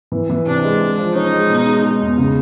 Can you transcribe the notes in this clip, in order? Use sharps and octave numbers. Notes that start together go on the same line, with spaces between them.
E3
E3
C3 D4
G#3
G#3
F3
C#4 D#4
G#3
B2
G#3
G#3 D#4
E2
C#3